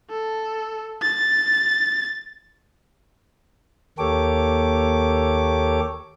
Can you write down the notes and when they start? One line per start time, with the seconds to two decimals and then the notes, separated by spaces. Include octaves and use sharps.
0.10 A4
1.02 A6
3.98 D#2 A#3 G4 A4 C#5 D6